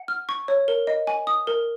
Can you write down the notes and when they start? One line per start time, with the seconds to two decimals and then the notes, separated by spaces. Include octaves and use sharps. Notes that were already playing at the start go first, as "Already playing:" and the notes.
Already playing: F#5
0.08 F6
0.29 C#6
0.48 C#5
0.68 A#4
0.87 D#5
1.07 G#5
1.27 D#6
1.47 A#4